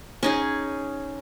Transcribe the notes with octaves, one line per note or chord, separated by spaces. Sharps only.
C#4 D#4 G#4